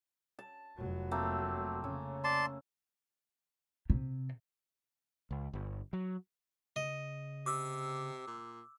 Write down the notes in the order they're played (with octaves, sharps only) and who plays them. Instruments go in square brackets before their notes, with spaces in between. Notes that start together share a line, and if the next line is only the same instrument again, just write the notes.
[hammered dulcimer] A5
[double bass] F1 F#3
[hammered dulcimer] A3 A#3 C4
[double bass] C#3 [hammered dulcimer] C#4
[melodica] D5 A5 C6
[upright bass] C3
[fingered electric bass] C#2
G1
F#3
[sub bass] C#3 [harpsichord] D#5
[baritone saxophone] C3 [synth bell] D6 E6
[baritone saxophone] A#2